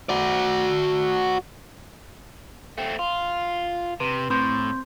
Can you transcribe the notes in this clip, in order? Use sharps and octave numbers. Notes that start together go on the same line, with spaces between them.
F#4 D5
A3 C4
F4
C3 B4
A2 C4 C6 G6